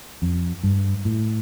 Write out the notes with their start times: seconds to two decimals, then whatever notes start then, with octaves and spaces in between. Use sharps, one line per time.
0.22 F2
0.64 G2
1.05 A2